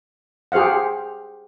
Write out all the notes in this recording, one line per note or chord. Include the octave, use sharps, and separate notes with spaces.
G4 G#4 C5 F5 F#5